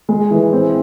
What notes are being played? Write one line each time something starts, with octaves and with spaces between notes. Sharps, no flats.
G#3
E3
C4